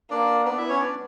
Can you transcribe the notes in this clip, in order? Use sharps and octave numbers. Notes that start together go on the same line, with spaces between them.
A#3 D4 D5
B3 D4 D5
E4 E5
C#4 C#5
D4 D5